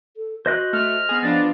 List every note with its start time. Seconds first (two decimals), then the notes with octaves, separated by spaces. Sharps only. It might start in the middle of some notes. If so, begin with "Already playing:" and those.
0.17 A4
0.46 F#4 C5 D#5 F#6
0.73 A3 F6
1.09 B3 G#4
1.23 F3 B3 D4 F4 A6